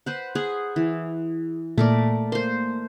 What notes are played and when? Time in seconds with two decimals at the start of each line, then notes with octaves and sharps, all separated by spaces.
0.06 B4 C5 F#5
0.35 G#4 F#5
0.76 E3
1.78 A#2 A3 A#4 D5
2.32 A#3 C5 C6